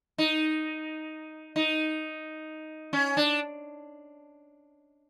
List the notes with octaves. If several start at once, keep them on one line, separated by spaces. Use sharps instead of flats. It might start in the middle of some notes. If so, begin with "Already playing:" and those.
D#4
D#4
C#4
D4